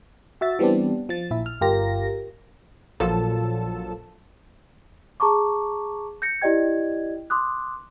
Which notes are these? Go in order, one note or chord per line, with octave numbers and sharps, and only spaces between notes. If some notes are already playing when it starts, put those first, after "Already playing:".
F#4 E5 A6
E3 G3 B3 C4 D4
F3 A6
A#1 E4 E5
F6
G1 F4 G4 A#4 A#6
A#1 A#2 F3 F#3 A4 A5
G#4 A5 A#5 C#6 D6
G6 A#6 C#7
E4 G4 D5 D#5 G5 G#6
C6 D6 D#6 F#6